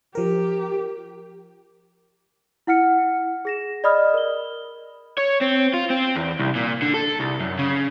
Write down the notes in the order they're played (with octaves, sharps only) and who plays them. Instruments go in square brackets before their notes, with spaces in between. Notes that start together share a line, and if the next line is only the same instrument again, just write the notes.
[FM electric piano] F3 A#4 [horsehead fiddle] G4
[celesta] E4 F#5 F6 C#7
G#4 A#6 E7
D5 D#5 B5 D#6 F6
A#4 G7
[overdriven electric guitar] C#5
C4
F4
C4
E2
C2
A#2
D3
A4
C2
F#2
C#3